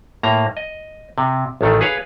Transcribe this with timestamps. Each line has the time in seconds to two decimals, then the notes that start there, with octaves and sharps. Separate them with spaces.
0.23 A2 A#3 A#5
0.57 D#5
1.18 C3
1.61 A1 D#3 A3
1.81 G#4 B4 C#5 F5